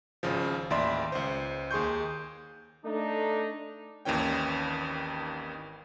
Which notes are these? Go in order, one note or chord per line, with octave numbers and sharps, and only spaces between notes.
G#1 C#3 F3
A1 D#2 D5 E5 B5 C6
C#2 C5
D#2 G#4 C6 C#6 G6
A3 D4 D#4
G#1 D#2 D#3 E3 C#4 G5